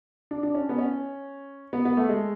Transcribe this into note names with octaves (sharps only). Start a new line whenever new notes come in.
D4
D4
C#4
B3
C#4
B3
B3
A3
G#3